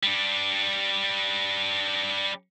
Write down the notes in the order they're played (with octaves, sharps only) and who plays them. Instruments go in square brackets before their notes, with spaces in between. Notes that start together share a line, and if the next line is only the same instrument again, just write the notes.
[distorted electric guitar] G3 D4